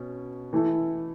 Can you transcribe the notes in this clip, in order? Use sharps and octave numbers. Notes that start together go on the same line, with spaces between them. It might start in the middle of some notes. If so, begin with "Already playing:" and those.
Already playing: B2 C#4
E3 A3 E4 A4